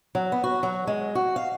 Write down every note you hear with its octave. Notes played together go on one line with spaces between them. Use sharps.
F#3
B3
F#4
F#3
G#3
F#4
F5